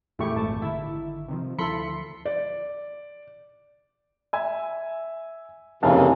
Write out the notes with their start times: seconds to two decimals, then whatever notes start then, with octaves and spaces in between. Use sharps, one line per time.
0.19 F2 A#2 E3 G#3 A3 E4 G4 C#6
0.36 G#1 A3 A5
0.62 G#1 D3 D#3 E4 E5
1.28 C3 D#3 F3
1.59 D2 F3 E4 A4 B5 C6 B6 C#7
2.25 D5
4.33 E5 G#5
5.83 F1 D#2 C#3 E3 F5 A5